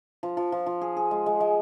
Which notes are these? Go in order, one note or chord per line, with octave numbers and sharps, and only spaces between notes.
F3
F3
F3
F3
G#4
G#4
G#3
G#3
G#3